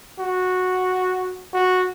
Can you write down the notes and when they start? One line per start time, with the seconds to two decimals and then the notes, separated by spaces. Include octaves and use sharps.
0.19 F#4
1.53 F#4